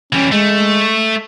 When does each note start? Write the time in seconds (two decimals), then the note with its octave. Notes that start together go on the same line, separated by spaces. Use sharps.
0.13 E3 G3 C#4
0.32 G#3 A3